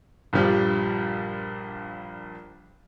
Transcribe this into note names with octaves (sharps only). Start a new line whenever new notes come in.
A#1 G2 F3 G3